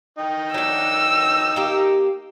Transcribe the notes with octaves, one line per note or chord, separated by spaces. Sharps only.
D#4 G5
F#3 D4 E6
A#3 G4